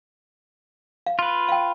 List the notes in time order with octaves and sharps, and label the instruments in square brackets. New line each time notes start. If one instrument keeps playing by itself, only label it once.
[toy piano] F5
[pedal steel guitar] F4 B4
[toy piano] F5 G5